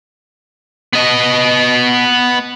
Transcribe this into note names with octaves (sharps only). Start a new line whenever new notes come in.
B3 D#5